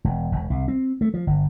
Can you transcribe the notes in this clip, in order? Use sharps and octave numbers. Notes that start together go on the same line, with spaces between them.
E1
E1
C2
C4
A3
F3
G1